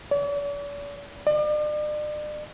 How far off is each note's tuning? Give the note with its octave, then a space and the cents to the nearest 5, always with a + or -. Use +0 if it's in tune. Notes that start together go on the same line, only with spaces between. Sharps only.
D5 -45
D5 +40